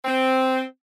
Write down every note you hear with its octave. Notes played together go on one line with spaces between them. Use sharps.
C4